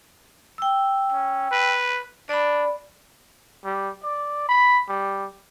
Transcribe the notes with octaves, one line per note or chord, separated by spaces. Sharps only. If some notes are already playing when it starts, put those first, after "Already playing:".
G5 E6
C#4
B4
D4 D5 B5
G3
D5
B5
G3